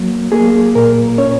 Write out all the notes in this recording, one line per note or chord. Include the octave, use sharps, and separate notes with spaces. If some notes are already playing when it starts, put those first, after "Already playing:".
Already playing: F#3 A#3
A#3 G#4
A#2 A#4
C#4 C#5